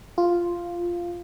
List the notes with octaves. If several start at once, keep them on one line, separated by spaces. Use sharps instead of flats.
F4